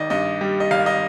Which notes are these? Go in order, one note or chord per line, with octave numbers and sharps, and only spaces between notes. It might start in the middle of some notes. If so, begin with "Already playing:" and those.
Already playing: G#1 D#3 D5 D#5
G2 D#5
G3
D#5
G#1 F5
D#5